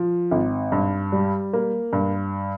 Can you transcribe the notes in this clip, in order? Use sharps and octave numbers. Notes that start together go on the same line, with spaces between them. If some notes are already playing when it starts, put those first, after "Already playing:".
Already playing: F3
G#1
G2
G3
A#3
G2